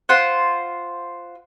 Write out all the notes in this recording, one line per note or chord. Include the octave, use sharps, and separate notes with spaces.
F4 C5 F#5